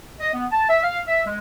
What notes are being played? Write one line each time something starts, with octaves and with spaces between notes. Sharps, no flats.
D#5
B3
A5
E5
F5
E5
G#3